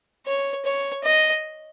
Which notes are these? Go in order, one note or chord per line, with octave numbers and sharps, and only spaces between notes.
C#5
C#5
D#5